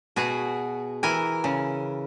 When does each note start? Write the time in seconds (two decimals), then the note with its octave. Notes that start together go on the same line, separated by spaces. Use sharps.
0.16 B2 F#4 G#4
1.03 E3 A#4 G#5
1.44 C#3